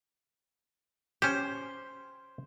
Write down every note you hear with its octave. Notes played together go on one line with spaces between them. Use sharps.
C#4 G4 C5